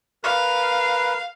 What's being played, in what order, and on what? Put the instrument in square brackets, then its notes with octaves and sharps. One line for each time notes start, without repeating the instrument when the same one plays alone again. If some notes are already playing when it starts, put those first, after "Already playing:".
[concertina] A#4 B4 [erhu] F5